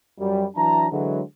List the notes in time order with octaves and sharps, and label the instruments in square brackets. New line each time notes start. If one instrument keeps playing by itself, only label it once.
[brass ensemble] F#2 G3
E3 F#3 D4 E5 A5 A#5
D3 E3 F#3 G#3